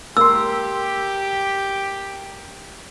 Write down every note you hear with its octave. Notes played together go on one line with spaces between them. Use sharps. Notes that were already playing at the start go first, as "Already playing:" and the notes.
A#3 G4 C6 E6